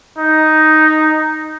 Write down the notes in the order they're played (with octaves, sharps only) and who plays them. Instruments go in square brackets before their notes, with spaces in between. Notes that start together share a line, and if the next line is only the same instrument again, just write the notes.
[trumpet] D#4